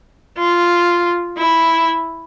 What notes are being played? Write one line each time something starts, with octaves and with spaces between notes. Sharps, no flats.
F4
E4